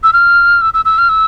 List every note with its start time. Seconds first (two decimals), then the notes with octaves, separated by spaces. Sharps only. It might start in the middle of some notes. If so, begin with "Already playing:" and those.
0.03 E6
0.13 F6
0.61 E6
0.74 E6
0.85 E6
0.98 F6
1.09 E6